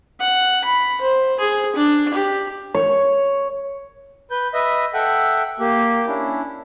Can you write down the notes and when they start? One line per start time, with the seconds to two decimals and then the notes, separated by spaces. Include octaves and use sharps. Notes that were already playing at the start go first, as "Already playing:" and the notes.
0.20 F#5
0.65 B5
1.01 C5
1.40 G#4
1.76 D4
2.14 G4
2.74 C#5
4.31 B4 G6
4.54 B4 D#5 E5
4.94 A4 E5 F#5 G5
5.60 A#3 G4
6.07 C#4 D4 E4